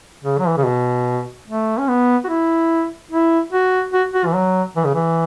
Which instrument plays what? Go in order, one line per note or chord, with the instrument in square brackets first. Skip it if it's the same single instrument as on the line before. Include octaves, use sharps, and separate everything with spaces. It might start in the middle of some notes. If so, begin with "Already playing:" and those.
[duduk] C#3
F#3
E3
C#3
B2
A3
C#4
B3
F#4
E4
E4
F#4
F#4
F#4
E3
F#3
E3
C#3
E3